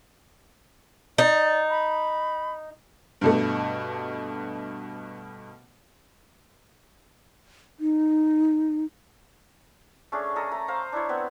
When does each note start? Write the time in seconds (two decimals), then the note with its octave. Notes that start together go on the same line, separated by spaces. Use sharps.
1.18 D#4 D5
1.69 B5
3.21 G2 B2 A3
7.80 D#4
10.12 A3 C#4 D4 G#4
10.36 A4 A#4 D#5
10.52 A3 A#5
10.68 C5 F5 A#5
10.93 D4 E4 C#5
11.09 B3 C4 B4